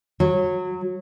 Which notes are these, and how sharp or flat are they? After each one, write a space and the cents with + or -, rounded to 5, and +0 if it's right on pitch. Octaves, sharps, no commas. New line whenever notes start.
F#3 -20